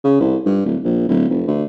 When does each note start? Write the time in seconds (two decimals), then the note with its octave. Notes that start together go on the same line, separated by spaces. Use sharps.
0.04 C#3
0.20 C2
0.46 G2
0.66 D1
0.84 A#1
1.09 D1
1.29 F1
1.47 D2